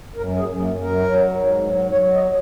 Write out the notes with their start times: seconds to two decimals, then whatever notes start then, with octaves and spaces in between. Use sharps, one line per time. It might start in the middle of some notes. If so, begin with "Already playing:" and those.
0.16 F#2 A#4
0.38 G#4
0.44 F#2
0.60 A#3
0.74 F#2
0.81 A#4
1.03 F#3
1.32 G#2
1.61 F#3
1.91 F#3 C#5
2.13 D#5